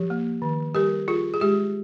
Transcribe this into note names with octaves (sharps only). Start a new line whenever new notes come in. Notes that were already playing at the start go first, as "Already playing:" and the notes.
Already playing: F3 G4
A#3
D#3
G3 G4 A#4
F4 G#4
G#4
G#3 G4